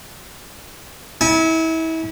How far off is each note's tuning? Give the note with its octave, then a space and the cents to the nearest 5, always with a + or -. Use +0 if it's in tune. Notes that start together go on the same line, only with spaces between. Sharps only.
E4 -35 G#5 +0